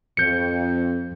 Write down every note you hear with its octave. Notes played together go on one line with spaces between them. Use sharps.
F2 G6 C#7